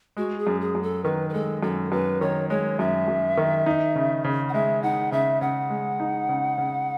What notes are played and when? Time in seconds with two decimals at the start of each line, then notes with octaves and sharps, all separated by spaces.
0.17 G#3 F#4
0.39 G#4
0.47 F#2
0.61 G#4
0.75 F#2
0.83 A4
1.04 D#3 B4
1.29 B4
1.34 G#3 A4
1.63 F#2 A4
1.91 F#2 B4
2.21 D#3 C#5
2.50 G#3 C#5
2.79 F#2 E5
3.08 F#2
3.37 D#3
3.66 D#4
3.95 C#3
4.24 C#3
4.49 F#5
4.54 G#3 E5
4.83 D#4 F#5
5.12 C#3 E5
5.41 C#3 F#5
5.70 G#3
6.00 D#4
6.29 C#3
6.58 C#3